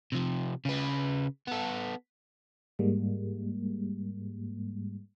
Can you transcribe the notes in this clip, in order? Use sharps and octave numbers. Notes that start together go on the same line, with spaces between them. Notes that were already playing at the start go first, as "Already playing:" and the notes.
C3 F3
C#3 B4
B3 A4
G#2 G3 G#3 A#3